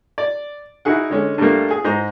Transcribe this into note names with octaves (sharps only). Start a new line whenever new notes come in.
D5
D#4 E4 F#4 G#4 F#5
D3 G#3 C#4
G2 G3 A3 A#3
G#4
G#2 C5 A#5